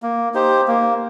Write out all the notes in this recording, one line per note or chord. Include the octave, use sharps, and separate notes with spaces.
A#3
D#4 G4 C5
A#3